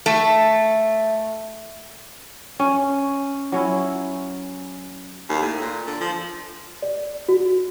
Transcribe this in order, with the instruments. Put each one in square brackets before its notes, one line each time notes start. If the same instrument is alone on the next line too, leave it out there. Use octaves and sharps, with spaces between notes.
[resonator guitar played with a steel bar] A3
[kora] C#4
F#3 C#4 E4
[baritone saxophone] D#2
A2
A#2
D3
F3
[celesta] D5
F#4